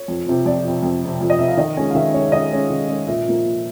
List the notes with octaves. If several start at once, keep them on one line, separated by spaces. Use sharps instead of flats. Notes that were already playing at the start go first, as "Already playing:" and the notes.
Already playing: C#5
F2
C3 F3
F2 D5
C3 F3
F2
C3 F3
F2
D#5
C3 F3 E5
F5
D#3 D#5
G#3 C#4 G#5
F5
D#3 E5
G#3 C#4 C#5
E5
D#3 D#5
G#3 C#4
D#3
G#3 C#4
A#2 E5
F3 A#3
A#2